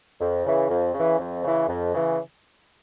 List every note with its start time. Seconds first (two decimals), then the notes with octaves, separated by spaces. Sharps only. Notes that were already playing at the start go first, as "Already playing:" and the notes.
0.20 F2
0.45 C#3 E3
0.69 F2
0.94 C#3 E3
1.19 F2
1.43 C#3 E3
1.68 F2
1.93 C#3 E3